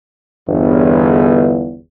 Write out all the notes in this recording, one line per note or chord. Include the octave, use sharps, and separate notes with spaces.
G1 E2